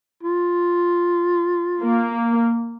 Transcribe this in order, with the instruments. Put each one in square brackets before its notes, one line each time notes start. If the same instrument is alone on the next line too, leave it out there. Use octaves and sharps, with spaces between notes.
[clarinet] F4
[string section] A#3